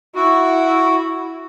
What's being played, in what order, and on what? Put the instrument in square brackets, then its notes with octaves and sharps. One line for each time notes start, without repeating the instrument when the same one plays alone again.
[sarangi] E4 [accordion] F#4